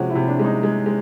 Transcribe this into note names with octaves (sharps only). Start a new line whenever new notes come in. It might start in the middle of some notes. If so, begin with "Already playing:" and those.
Already playing: C3 F3 G#3 C#4 F#4
E4
C3
D4
G#3
D#4
G#3
G#3